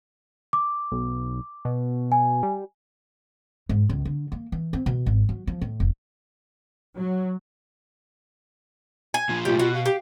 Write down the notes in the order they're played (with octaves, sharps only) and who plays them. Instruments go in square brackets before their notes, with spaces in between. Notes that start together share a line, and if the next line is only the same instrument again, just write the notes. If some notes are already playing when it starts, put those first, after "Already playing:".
[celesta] D6
[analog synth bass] B1
B2
[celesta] G#5
[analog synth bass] G3
[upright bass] G#2
C#2
D3
A#3
E3
C4
B2
G#1
F#3
F3
A2
F1
[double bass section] F#3
[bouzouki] G#5
[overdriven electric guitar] A#2 F3
[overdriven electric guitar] B1 A2 [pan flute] F4 [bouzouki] G4
[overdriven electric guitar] B2 [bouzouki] F#4
[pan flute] F5
[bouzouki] G4